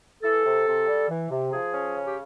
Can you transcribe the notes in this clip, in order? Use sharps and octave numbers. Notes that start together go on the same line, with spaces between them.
E3 A4
C3
C3
G3
E3
C3
F3 G#4
C#4
C#3
G4